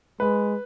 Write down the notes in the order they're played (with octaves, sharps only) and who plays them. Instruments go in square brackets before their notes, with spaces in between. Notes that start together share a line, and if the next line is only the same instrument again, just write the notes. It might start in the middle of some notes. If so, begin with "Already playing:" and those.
[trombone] G#3 [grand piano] B4